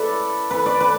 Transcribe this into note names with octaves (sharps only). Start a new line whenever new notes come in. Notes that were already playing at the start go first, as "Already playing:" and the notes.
Already playing: E4 A4 B4 D5
B4
D5
B4